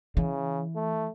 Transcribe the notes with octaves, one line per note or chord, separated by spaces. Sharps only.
C#3 E3
A3